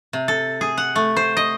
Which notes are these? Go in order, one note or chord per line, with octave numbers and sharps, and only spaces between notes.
C3
A4
G#4
F#5
A3
C5
D#5